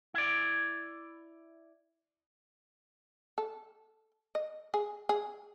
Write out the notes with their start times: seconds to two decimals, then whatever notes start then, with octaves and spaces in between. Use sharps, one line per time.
0.14 E4 D5
3.38 A4
4.35 D#5
4.74 G#4
5.09 G#4